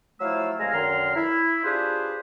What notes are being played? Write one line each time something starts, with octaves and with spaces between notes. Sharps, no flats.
F3 F#3 A3 E4 F5 E6
C2 G#3 F5 G#5 A#5
F#2 D3 D#3 A#5 C6 F6
E4
D4 F4 G4 G#4 B4 C5